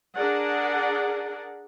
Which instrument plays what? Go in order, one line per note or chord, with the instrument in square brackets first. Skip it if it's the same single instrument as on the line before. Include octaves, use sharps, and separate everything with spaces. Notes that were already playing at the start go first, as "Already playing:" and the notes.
[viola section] D4 G#4 A#4 D5 F#5